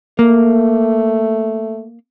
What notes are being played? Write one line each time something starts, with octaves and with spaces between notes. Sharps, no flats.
A3 A#3